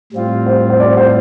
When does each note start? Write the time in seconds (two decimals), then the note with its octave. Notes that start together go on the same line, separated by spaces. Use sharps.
0.13 A2 G3 C4 F4
0.46 C5
0.70 C5
0.80 D5
0.97 C5